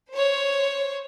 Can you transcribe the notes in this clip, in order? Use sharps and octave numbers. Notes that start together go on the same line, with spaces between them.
C5 C#5